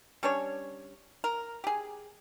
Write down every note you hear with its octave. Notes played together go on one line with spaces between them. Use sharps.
G3 C#4 D4 C#5
A#4
G4 G#4